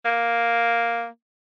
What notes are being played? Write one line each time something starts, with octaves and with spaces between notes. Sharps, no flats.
A#3